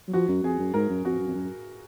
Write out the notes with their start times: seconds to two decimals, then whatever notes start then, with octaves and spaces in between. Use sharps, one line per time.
0.08 F#3
0.13 F3 F#4
0.28 F#2
0.43 F2 G#4
0.59 F#2
0.74 G#2 A#4
0.89 F#2
1.05 F2 F#4
1.20 F#2
1.27 F2
1.34 F#2